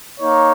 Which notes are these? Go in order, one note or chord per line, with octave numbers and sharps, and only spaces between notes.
A#3 D#4 C#5